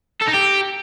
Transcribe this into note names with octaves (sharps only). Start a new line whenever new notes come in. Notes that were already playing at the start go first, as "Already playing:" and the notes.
A4
D#4
G4